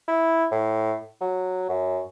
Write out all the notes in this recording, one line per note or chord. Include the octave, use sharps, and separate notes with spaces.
E4
A2
F#3
F#2